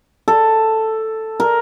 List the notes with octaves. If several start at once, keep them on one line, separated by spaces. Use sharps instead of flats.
A4
A#4